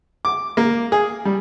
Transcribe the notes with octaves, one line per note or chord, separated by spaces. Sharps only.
D6
A#3
G#4
G3